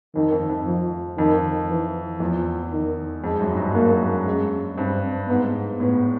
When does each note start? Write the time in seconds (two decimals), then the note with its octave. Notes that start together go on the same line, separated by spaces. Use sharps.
0.15 F2 D#3
0.32 F2
0.50 F2
0.66 F3
1.18 F2 D#3
1.69 E3
2.20 E2 F3
2.72 D#3
3.23 F2 G#3
3.40 F#2
3.50 G#2
3.57 G2
3.75 F#2 A#3
4.26 G#3
4.77 G2 C4
5.28 G#2 B3
5.80 A2 B3